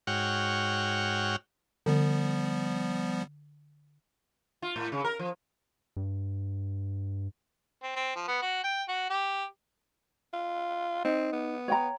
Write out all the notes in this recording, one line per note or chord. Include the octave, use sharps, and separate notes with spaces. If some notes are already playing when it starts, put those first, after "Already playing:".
G#2 F#4 C#5 F#5 G5 F6
D3 F3 G3 B3
F4
A2
C#3
A#4
F3
G2
C4
C4
F3
B3
F#4
G5
F#4
G4
F4
C4 D#4
B3
C#5 G5 A#5